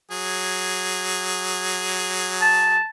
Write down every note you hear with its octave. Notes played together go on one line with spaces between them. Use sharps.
F#3 G#4
A5